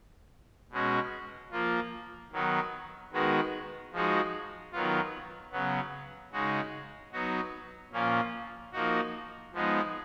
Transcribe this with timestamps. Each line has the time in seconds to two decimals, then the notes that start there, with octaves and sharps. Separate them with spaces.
0.71 B2 G#3 C#4 F#4
1.51 F3 A#3 F4
2.32 D#3 F#3 B3 D#4
3.12 D#3 G#3 B3 F#4
3.92 F3 G#3 D#4 F#4
4.72 D#3 F#3 B3 F4
5.52 C#3 F#3 B3
6.32 C#3 G#3 D#4 F#4
7.13 F#3 B3 D#4 F#4
7.92 A#2 F3 A#3 C#4 F4
8.73 F3 A#3 D#4 F#4
9.53 F3 G#3 B3 D#4